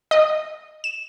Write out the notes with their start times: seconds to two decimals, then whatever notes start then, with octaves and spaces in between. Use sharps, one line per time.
0.11 D#5
0.84 E7